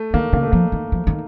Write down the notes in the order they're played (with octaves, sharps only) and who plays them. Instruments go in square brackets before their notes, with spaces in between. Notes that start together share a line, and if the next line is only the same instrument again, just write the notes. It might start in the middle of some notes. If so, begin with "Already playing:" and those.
Already playing: [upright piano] A3
[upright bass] D#3 [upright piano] A#3
[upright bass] C#3 [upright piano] A#3
[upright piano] A3
[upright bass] F3 [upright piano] A#3
[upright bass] D#3
F3
D#3